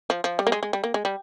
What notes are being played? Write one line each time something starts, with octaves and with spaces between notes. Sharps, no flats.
F3
F3
G3
A#3
G#3
G#3
G3
A#3
G#3
G3